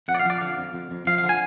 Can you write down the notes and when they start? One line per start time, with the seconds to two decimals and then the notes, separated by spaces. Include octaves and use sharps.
0.08 F2 F#5
0.15 D5
0.19 F5
0.25 F3 D5
0.41 D3 F5
0.57 F2
0.74 F2
0.91 F2
1.07 F3 F5
1.18 F5
1.24 D3
1.29 G#5